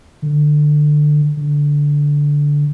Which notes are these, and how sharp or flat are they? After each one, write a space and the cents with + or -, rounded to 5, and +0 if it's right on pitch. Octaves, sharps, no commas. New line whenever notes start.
D3 +20
D3 -10